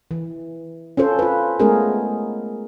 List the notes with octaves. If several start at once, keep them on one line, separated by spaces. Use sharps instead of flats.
E3
C#4 F4 A4 C5
F4 B4
G#3 A3 B3 C#4 G#4 A#4